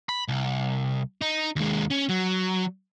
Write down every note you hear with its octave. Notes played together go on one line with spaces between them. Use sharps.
B5
C2
D#4
D#2 G#3
C#4
F#3